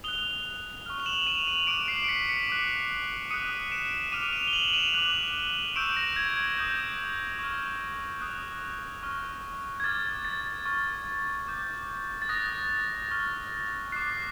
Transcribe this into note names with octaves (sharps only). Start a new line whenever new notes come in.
D#6 F#6 F7 G7
C#6 F6
F7
E7 F#7
D#7 F7
D#7 F7
D6 F#6 D7 E7
C7 D7
D7
B6 C#7
B6 C#7
D6 F#6
D#6 F#6 C#7 D#7
D7 E7
D6 F6 D#7 F7
D#7 F7
G7
E7 F#7
D#7 F7
D6 F#6
C#6 E6 G6 D7 E7
A#6
G#6
G#6
D#6 G6
C#6 F6
D#6 F#6
C#6 F6
G#6
D6 F6 A6
A6
C#6 F6
D6 G6
A6
D#6 F#6 A#6
C#6 F6
D6 F#6 C7